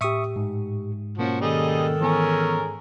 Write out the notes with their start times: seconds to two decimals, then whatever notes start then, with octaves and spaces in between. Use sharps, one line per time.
0.01 A2 G4 E5 C#6 D#6
0.36 G#2
1.18 B2 F3 A#3 C#4 F#4
1.41 D#3 G3 G#4 A4 D#5
2.01 E3 B3 C#4 G#4 A#4 G#5